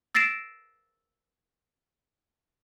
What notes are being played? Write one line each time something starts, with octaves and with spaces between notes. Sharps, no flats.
E6 A6 A#6 C7 D7 E7